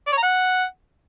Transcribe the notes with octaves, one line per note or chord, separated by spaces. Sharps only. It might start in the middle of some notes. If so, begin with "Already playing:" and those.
D5
C#5
A#5
F#5